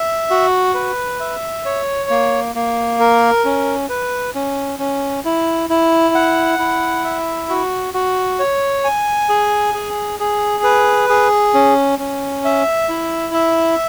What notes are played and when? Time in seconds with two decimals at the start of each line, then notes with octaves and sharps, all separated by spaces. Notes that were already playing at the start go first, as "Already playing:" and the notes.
Already playing: E5
0.30 F#4
0.74 B4
1.20 E5
1.65 C#5
2.10 A#3
2.55 A#3
3.00 A#4
3.45 C#4
3.89 B4
4.35 C#4
4.79 C#4
5.25 E4
5.69 E4
6.15 F#5
6.59 E4
7.05 E5
7.49 F#4
7.94 F#4
8.39 C#5
8.85 G#5
9.29 G#4
9.74 G#4
10.20 G#4
10.64 B4
11.09 G#4
11.54 C#4
11.99 C#4
12.45 E5
12.89 E4
13.34 E5